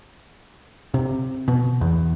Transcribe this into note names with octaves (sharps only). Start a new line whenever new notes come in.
C3
B2
E2